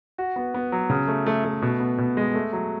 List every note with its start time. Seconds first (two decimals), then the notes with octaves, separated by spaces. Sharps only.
0.18 F#4
0.36 B3
0.54 B3
0.72 F#3
0.90 C#3
1.08 A3
1.26 A3
1.45 A3
1.62 B2
1.80 B3
1.98 B2
2.17 G#3
2.34 A3
2.53 F#3